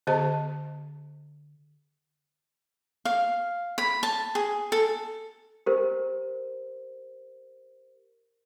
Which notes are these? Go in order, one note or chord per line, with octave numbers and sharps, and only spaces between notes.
D3 B3 G4 C5 D#5 A5
F5
B5
A5
G#4
A4
G4 A#4 C5